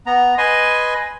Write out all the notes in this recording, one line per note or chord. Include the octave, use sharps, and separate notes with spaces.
B3 A#5
B4 D#5 G#5 C6